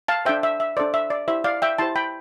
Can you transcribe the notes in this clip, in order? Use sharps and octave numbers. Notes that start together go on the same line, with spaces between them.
F5 A5
D4 A4 C5 E5 G5
E5
E5
D4 A4 C5 D5
E5
D5
E4 G4 C5 E5
D5 F5
E5 G5
E4 G4 C5 A5 C6
G5 B5